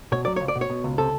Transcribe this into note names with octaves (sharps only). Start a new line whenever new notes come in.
B2 C#5
F#3 D5
C#2 C#5
D5
B2
C#5
B2
C#2
C3 A4